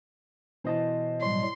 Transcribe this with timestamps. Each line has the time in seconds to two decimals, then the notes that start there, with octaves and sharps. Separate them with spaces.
0.64 B2 E3 C5 D#5 A5
1.21 A2 F#3 G3 C6